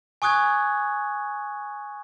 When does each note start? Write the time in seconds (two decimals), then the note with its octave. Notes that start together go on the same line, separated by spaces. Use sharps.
0.22 G#5 C#6 D#6 F#6 G#6